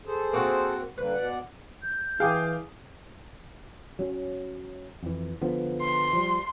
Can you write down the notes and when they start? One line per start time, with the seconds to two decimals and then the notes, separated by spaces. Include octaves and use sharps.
0.06 G#4 A4 C5
0.33 A#3 C4 F#4
0.98 D3 G3 A#3 B4
1.14 B2 D5 F#5
1.82 G6
2.20 E3 G#4 F5 G5 D6
3.99 F#3 C#4
5.03 F2 E3
5.41 D3 F3 B3
5.81 C6
6.13 F3 G3